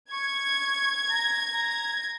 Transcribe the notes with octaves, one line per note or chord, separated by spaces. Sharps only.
C#6 G#6
A#5
A#5